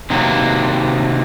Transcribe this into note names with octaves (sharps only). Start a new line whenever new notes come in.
C3 D#3 F#3 A#3